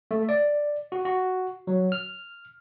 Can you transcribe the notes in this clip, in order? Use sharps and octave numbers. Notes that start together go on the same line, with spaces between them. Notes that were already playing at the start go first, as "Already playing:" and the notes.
A3
D5
F#4
F#4
F#3
F6